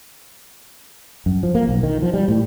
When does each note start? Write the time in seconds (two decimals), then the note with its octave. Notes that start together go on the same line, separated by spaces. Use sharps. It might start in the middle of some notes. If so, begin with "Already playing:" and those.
1.26 F#2
1.43 F3
1.55 A#3
1.67 B1
1.83 D#3
2.02 F3
2.14 G3
2.28 A2